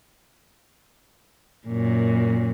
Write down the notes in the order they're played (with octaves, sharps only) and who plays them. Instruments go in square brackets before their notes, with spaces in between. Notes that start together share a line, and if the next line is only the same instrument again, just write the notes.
[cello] F#2 A#2